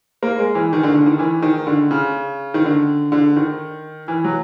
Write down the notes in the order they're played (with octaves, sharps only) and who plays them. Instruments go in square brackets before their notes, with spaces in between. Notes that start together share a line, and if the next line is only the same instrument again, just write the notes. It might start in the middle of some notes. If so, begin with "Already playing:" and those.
[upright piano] A#3
G#3
E3
D#3
D3
D3
D#3
E3
D#3
D3
C#3
D#3
D3
D3
D#3
E3
F#3